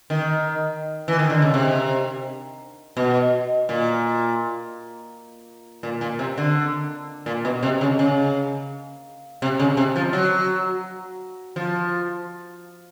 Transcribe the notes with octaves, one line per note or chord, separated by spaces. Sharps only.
D#3
E3
D#3
D3
C#3
C3
B2
A#2
A#2
A#2
C3
D3
A#2
B2
C3
C#3
C#3
C3
C#3
C3
F3
F#3
F3